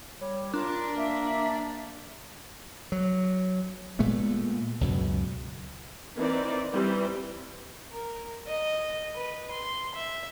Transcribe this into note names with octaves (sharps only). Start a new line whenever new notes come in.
G3 C#5
D4 F4 A#4
A#3 E5
F#3
A#2 G#3 A3 B3
C#2 F#2 B2
E3 C4 D#4 A#4 D5
E3 G3 C4
A#4
D#5
B4
C6
E5